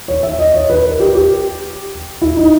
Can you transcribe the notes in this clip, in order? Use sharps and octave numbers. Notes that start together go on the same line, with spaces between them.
C#5
E5
D#5
C#5
B4
A#4
G4
G4
E4
D#4